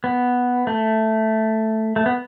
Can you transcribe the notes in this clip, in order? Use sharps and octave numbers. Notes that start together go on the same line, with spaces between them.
B3
A3
A3
B3